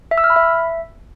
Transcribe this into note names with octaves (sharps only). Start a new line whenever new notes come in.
E5
E6
F6
B5
E5